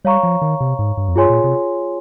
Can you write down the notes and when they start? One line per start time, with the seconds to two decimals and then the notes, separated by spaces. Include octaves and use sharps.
0.04 G3 C#5 F5 A#5 C#6
0.23 F3
0.42 D#3
0.61 C3
0.79 G#2
0.97 G2
1.08 F2
1.16 G2 F4 G#4 C#5 G#5 C6
1.30 A#2
1.44 C3